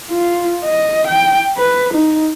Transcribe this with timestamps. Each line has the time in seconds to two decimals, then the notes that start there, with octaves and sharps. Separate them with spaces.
0.11 F4
0.64 D#5
1.07 G5
1.58 B4
1.94 D#4